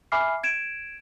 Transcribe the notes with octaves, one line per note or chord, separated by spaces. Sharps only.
E5 G#5 B5 D6 F6 C7
G#6 D7 E7